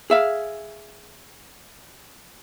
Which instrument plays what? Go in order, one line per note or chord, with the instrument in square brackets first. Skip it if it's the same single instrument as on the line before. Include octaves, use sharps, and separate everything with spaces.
[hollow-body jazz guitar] G#4 E5 F5